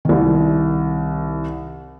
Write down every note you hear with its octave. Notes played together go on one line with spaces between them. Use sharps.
C2 D#3